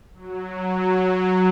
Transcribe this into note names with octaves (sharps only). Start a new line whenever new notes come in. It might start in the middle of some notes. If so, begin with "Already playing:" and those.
F#3